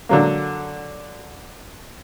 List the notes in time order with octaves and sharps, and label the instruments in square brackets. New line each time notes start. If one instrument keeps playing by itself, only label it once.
[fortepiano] D3 F#3 A#3